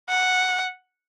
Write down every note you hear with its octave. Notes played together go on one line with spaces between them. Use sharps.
F#5